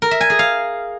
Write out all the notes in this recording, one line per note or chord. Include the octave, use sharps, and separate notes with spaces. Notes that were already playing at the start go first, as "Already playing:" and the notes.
A#4
E5
G#5
G#4
F5